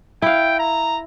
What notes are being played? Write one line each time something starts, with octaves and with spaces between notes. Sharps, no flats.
E4 F5 G5
A#5